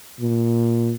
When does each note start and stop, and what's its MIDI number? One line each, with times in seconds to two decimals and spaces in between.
0.21 0.93 46